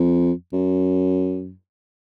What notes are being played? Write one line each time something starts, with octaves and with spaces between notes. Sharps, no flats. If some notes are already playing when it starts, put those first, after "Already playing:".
Already playing: F2
F#2